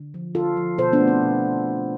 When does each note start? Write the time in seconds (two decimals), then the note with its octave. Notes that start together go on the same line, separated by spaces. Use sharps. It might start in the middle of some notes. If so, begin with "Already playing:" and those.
Already playing: D3
0.14 F3
0.35 D3 F4 A4
0.57 F3
0.78 B2 A4 C5
0.93 B3 D4
1.00 A3
1.08 C4
1.22 B2